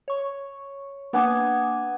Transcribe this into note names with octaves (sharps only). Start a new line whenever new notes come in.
C#5 C#6
A#3 B3 D4 G#5 D6